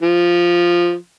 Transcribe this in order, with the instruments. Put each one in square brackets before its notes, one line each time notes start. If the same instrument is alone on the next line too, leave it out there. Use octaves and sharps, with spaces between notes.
[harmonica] F3